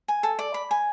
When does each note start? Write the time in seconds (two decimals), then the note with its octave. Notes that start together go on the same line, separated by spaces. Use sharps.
0.08 G#5
0.23 A4
0.39 D5
0.54 B5
0.71 G#5